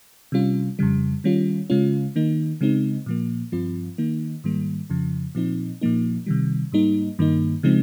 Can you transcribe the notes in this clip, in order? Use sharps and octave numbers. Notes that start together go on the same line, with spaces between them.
C3 G3 C#4 F4
F2 C#3 G3
D#3 G3 C#4 F4
C#3 G#3 C#4 F4
D#3 A#3 D#4
C#3 G#3 C4 D#4
A#2 F3 A#3
G2 F3 C4 F4
D#3 A#3 D#4
G#2 D#3 G3 A#3
F2 C#3 F3
A#2 F3 C4 D#4
A#2 F3 A#3 D#4
C3 D#3 G3
G#2 G3 A#3 D#4
G2 D#3 A#3 D#4
C#3 F3 G#3 C4 D#4